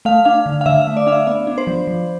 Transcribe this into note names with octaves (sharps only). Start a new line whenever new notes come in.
A3 F5
D4 F5
D3
F5
D3 E5
E5
A3
D5
D4 F5
E5
B3 D5
D4
C5
F3
F3